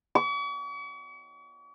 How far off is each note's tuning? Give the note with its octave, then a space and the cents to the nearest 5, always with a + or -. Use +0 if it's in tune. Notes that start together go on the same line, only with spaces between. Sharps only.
C#6 +45